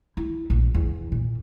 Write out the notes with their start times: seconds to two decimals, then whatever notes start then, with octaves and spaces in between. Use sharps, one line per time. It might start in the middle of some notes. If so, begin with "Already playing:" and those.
0.17 E4
0.50 A#1
0.74 E2
1.12 A#2